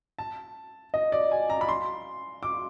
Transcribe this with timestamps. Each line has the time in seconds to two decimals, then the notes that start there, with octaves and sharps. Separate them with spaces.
0.18 A5
0.94 D#5
1.12 D5
1.32 G#5
1.50 A#5
1.61 B5
1.69 C6
2.43 D6